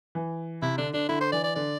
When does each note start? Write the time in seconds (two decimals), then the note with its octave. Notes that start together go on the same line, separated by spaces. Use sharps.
0.15 E3
0.62 C3 E4
0.78 D3 D4
0.94 D3 D4
1.09 D3 E4
1.21 C5
1.32 E3 D5
1.44 D5
1.56 D3 D5